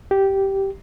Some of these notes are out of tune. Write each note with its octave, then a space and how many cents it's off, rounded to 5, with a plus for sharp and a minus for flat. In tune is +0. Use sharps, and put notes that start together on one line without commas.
G4 -10